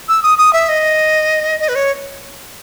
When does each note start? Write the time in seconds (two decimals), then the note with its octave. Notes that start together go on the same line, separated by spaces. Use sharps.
0.08 E6
0.23 D#6
0.38 D#6
0.53 E5
0.69 D#5
1.60 D#5
1.68 B4
1.75 C#5